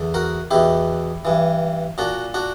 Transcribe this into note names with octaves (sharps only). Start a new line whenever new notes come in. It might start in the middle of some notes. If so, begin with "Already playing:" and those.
Already playing: E2 D3
F#4 A#4
E2 B2 E4 G4
G2 E3
A#2 D4 F#4
D4 F#4